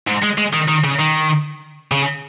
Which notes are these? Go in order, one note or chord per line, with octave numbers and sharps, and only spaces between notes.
G#2
G#3
G#3
D#3
D#3
C#3
D#3
C#3